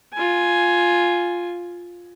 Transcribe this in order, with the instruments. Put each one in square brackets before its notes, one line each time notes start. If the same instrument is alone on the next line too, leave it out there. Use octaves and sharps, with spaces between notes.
[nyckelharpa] F4 G#5